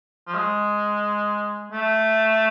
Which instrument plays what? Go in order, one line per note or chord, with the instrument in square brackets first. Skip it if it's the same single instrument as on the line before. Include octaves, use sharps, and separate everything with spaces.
[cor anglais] F3
G#3
A3